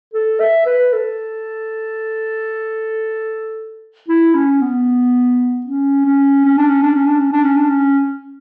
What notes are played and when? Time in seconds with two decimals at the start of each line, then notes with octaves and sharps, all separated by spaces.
0.14 A4
0.40 E5
0.66 B4
0.93 A4
4.08 E4
4.34 C#4
4.61 B3
5.66 C#4
6.06 C#4
6.45 C#4
6.57 D4
6.70 C#4
6.82 D4
6.95 C#4
7.07 D4
7.20 C#4
7.32 D4
7.44 C#4
7.57 D4
7.70 C#4